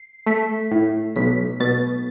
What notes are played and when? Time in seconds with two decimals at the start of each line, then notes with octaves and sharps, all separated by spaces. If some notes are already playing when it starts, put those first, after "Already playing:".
Already playing: C7
0.26 A3 B6
0.71 A2
1.16 B1 B6
1.60 B2 A6